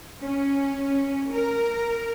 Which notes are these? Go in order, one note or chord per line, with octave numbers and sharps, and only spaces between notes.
C#4
A#4